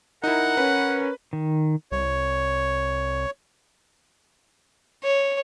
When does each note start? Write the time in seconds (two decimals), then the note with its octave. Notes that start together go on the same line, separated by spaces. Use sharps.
0.24 D#4 E4 A#4 F#5
0.57 C#4 B4
1.33 D#3
1.92 C2 C#5
5.03 C#5